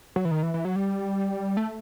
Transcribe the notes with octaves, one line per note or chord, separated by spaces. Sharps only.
F#3
E3
D#3
E3
E3
F#3
G3
A3